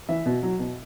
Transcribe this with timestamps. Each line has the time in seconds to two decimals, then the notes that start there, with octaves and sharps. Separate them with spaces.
0.09 E3 E5
0.26 B2
0.43 F#3
0.59 B2